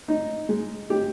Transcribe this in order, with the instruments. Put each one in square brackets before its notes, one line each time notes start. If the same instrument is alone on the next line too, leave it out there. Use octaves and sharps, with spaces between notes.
[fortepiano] D#4
G#3
G4